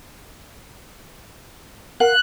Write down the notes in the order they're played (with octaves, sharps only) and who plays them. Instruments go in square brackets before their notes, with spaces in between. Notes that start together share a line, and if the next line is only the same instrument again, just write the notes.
[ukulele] A#4 F5 F#5 [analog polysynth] F#6